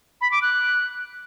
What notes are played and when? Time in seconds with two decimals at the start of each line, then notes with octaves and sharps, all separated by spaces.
0.21 B5
0.32 D6
0.42 F#6